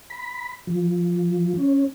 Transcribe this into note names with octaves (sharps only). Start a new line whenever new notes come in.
B5
F3
C#4